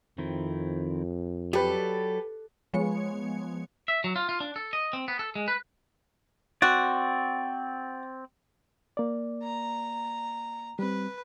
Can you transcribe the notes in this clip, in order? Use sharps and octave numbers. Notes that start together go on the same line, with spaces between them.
F2 D#3 C4 E4
F#3 G4 A4 B4 D5
F3 G#3 B3 C#5 C#7
E5
F#3
F4
F4
D4
A4
D#5
C4
B3
A4
G#3
B4
C4 F#4 D5
A#3 D5
A#5
G3 C4 B4